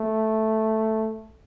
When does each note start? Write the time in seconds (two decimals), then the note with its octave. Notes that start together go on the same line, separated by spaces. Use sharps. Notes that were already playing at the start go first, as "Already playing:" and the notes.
Already playing: A3